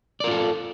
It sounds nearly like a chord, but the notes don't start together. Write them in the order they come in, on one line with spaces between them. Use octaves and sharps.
D5 A#4 F4 A4